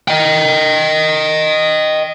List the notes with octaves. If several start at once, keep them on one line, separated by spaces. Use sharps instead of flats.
D#5 G5